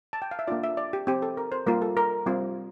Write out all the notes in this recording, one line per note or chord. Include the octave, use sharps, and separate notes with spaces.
A5
G5
F5
E5
A#3 D4 F4 D5
E5
D5
G4
C4 G4
A4
A#4
C5
G3 A#3 F4 A#4
A4
A#4
G3 C4 F4